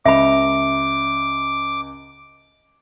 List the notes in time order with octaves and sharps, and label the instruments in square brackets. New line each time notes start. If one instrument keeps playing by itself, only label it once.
[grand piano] C#2 [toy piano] E5 B5 [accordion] D6